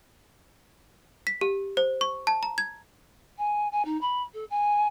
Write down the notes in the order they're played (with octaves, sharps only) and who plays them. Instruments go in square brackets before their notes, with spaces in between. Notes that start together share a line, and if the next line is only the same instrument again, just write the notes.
[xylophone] B6
G4
C5
C#6
A5
A#5
G#6
[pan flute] G#5
G#5
D#4
B5
A4
G#5